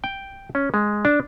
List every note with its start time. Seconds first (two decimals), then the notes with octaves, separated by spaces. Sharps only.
0.04 G5
0.55 C#4
0.74 G#3
1.05 D4